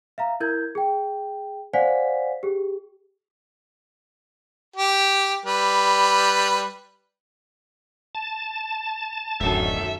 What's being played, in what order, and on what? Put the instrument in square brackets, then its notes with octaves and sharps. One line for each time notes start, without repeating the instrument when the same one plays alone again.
[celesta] E5 F5 A#5
E4 A#4 G6 G#6
G#4 G5
C5 D5 F5 F#5 G#5 B6
G4 G#4
[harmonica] G4
G3 B4
[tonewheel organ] A5
[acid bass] D1 [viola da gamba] F#2 D#3 A4 [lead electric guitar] E5